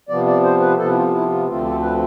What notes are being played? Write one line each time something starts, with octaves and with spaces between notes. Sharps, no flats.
C3 F3 B3 D5
D5
C5
B4
C3 F3 B3 A4
E4
F4
F4
E4
F4
D2 D3 F3 A3 C4 F4
A4
B4